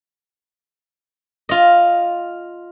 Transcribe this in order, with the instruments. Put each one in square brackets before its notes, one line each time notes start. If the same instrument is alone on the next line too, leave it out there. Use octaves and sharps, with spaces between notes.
[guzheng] F4 D#5